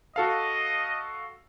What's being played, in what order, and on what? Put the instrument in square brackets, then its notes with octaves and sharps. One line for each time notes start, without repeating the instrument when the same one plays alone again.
[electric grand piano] F#4 A4 F5 [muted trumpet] D#5